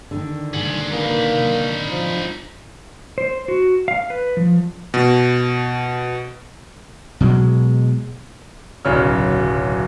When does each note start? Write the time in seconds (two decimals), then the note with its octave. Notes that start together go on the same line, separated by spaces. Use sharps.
0.11 D3 D#3
0.53 G#4 F#5
0.92 A#3 D#4 B4
1.90 F3
3.18 C5
3.48 F#4
3.88 F5
4.10 B4
4.37 F3
4.94 B2
7.21 B2 F#3 G#3
8.85 D1 B1 C#3 C#4 F6